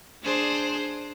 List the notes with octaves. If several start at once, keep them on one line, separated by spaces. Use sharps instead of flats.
D4 G#4 C5